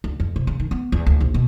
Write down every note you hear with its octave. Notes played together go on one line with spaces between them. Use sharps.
D2
F2
C3
C#3
D#3
B3
E2
D2
A#1
B2